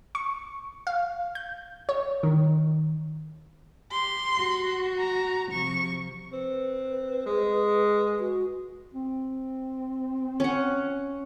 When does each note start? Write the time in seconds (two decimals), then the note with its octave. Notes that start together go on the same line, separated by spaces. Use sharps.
0.15 C#6
0.87 F5
1.35 G6
1.89 C#5
2.23 D#3
3.92 G4 C6
4.36 F#4
4.99 A#5
5.51 C3 F3 C#6
6.33 C4 B4
7.26 G#3
8.19 F#4
8.94 C4
10.40 C#4 F#5